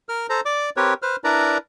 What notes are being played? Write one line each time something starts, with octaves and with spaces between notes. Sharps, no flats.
A#4 F6
A4 C5 A#5
D5 D6
C4 G4 A#4 B4 C#5
B4 C5 F6
D4 E4 A#4 B4 D5 A#5